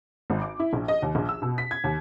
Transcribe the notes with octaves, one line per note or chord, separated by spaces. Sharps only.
G#1
D6
E4
A#1
D#5
D#2
A#1
E6
B2
B6
G#6
D#2